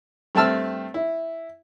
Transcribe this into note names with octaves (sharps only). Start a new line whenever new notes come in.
G2 A3 C4 A5 E6 F6
E4